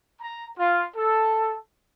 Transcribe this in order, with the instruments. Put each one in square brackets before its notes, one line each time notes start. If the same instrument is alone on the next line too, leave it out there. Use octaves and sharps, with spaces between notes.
[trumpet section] A#5
F4
A4